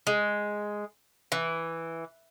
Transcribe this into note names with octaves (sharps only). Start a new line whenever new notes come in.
G#3
E3